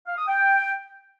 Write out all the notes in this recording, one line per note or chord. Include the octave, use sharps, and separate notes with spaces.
F5
D#6
G5